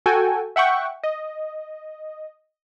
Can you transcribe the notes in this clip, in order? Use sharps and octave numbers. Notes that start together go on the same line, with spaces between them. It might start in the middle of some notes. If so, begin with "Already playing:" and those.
F#4 A4 G5 G#5
E5 F#5 G5 C#6
D#5